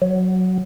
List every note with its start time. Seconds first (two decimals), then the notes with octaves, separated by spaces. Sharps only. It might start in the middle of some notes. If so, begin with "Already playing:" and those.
0.02 F#3